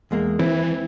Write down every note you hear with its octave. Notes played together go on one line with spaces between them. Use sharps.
E2 G#3 A#3
E3 C4 E4 B4